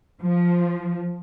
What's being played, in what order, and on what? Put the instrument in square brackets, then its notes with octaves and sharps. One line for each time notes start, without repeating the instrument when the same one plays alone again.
[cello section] F3